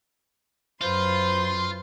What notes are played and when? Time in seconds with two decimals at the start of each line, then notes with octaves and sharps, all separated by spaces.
0.81 F#2 F4 B4 C5 C6